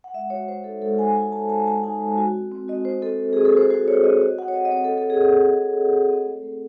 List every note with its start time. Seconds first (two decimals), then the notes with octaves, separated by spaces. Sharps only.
0.04 F#5
0.14 G#3 E5
0.30 F#4 C#5
0.48 G#3 C5
0.64 D#4 A4
0.82 G#3 A4
0.98 D#4 G#5
1.15 F#4 G#5
1.32 G#3 A5
1.49 G#3 A5
1.66 G#3 A5
1.83 D#4 G#5
2.00 G#3
2.18 F#4
2.34 C4
2.51 C4
2.68 F#4 D#5
2.85 C4 C5
3.02 C4 A4
3.20 F#4
3.33 C4 G#4
3.45 A4
3.53 F#4 C5
3.70 F#4 C5
3.88 C4 C#5
4.04 F#4 D#5
4.21 F#4 D#5
4.39 F#4 F#5
4.48 C#5
4.55 F#4 D#5
4.65 D#5
4.72 C4 C#5
4.84 A4
4.90 C4
4.98 A4
5.06 F#4 G#4
5.23 F#4 A4
5.40 F#4
5.57 C4
5.74 C4
5.92 F#4
6.09 C4
6.25 A3
6.43 A3